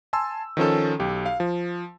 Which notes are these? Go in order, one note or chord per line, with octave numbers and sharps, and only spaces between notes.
G#5 A5 C6 E6
D#3 F3 C#4 A4
B1 G4
F5
F3